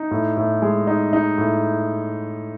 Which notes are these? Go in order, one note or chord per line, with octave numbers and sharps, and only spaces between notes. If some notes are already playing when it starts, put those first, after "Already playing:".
Already playing: D#4
A2
A2
G#3
D#4
D#4
A2